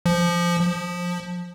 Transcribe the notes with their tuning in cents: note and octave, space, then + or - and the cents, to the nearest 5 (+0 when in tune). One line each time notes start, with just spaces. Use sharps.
F3 -10
F3 +15